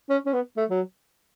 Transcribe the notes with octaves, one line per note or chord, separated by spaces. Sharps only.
C#4
C#4
B3
A3
F#3